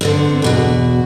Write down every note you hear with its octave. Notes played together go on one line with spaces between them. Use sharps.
D3 B3 C4
E2 B2 F#4